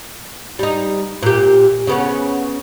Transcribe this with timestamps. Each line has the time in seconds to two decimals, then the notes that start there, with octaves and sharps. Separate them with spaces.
0.59 G3 D#4
1.23 A#2 G4
1.87 C#3 B3 C#4